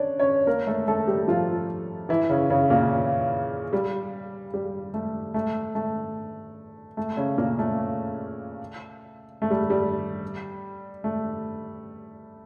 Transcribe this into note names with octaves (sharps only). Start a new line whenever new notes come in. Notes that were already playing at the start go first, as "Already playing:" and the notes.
Already playing: C#4 D4 C#5 D5
C#4 C#5
A#3 A#4
A3 A4
A3 A4
G3 G4
F3 F4
E3 E4
C#3 C#4
C#3 C#4
A#2 A#3
G3
G3
A3
A3
A3
A3
C#3 C#4
A#2 A#3
A3
A3
G3
G3
A3